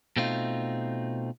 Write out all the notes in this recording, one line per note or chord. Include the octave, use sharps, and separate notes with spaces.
B2 A3 C4 D#4 F4